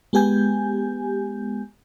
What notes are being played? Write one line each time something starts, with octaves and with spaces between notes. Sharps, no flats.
G#3 B3 G4 G#5 G6